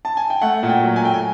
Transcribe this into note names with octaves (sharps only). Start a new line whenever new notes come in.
A5
G#5
G5
A3 F#5
A#2
G5
F#3
G#5
A3 G5
G#5